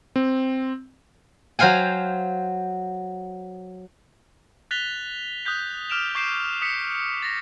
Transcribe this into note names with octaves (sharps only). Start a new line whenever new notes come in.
C4
F#3 C5 F5 G5 G#5
F#6 A6 B6 F7 G7
D#6 F#6 G6 B6
D6 F6 D7 E7 F7
C#6 D6 G6 C7 D7 E7
D#6 B6 C#7
A6 A#6